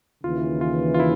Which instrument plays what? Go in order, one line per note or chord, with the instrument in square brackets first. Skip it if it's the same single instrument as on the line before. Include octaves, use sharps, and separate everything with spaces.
[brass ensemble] D#2 C#3 E3 [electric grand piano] F4
[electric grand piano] F4
F4
E4